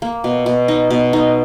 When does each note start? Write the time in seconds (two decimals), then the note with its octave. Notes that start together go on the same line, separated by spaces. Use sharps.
0.02 A#3
0.24 B2
0.46 B2
0.68 D#4
0.90 B2
1.13 D#4